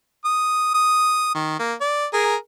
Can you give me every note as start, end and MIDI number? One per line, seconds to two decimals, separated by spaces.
0.25 0.70 87
0.74 1.32 87
1.35 1.58 51
1.59 1.74 58
1.81 2.06 74
2.13 2.35 68
2.13 2.35 70